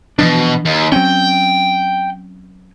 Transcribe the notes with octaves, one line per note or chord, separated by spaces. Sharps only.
B2 E3 F3 D4
D#2
F#3 C4 C#4 G5